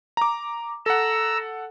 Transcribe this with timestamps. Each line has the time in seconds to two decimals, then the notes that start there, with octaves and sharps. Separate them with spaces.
0.17 A#5 D6
0.86 A4 F#5 A#5 E6